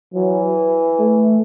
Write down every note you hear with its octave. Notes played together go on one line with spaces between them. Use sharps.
E3 F#3
A3